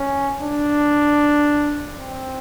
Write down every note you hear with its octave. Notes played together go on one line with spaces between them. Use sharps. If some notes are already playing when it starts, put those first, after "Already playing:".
Already playing: C#4
D4
C4